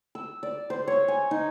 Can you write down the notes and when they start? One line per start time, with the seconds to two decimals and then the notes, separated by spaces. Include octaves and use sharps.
0.15 E6
0.43 D5
0.70 C5
0.87 C#5
1.08 G#5
1.31 D#4